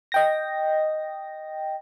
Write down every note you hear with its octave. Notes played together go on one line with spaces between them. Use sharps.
D#5 G5 A#6